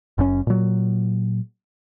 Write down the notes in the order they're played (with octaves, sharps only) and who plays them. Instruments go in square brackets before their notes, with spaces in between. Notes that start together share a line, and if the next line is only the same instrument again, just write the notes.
[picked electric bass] F#1 F#2 C3 C#4
A#2 F#3